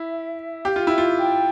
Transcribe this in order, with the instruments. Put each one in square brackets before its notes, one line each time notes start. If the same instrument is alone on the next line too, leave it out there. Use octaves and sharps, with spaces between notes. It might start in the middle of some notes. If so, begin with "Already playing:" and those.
Already playing: [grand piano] E4 [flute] E5
[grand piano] G4 [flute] F5
[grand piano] F4
[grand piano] E4 [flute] G5
[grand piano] F4
[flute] G5